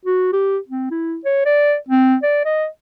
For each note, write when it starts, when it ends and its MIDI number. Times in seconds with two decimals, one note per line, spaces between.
0.05 0.31 66
0.33 0.57 67
0.68 0.90 60
0.91 1.18 64
1.25 1.44 73
1.46 1.75 74
1.89 2.15 60
2.23 2.43 74
2.45 2.66 75